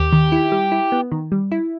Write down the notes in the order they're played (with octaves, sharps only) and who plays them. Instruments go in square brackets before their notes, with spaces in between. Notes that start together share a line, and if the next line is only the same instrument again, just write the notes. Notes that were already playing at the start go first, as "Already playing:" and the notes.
Already playing: [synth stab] D#2 [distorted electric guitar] G4
[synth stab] D#3
E4
G3
E4
B3
D#3
G3
E4